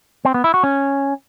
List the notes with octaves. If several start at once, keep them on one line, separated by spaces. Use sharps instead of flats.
C4
B3
E4
F#4
C#4